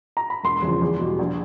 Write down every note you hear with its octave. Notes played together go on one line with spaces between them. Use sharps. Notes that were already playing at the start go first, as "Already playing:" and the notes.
A#5
B5
E1 C6
E2 C#3 F3
E2
B2
G3
A#1